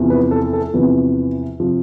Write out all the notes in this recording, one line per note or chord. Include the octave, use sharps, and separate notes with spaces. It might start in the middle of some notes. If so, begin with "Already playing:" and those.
Already playing: E2 C3 F3
B4
A4
A4
E2 C3 F3 B4
C3 F3